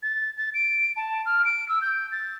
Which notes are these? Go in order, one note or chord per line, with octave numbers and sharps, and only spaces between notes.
A6
A6
D7
A5
F6
D7
E6
G6
A6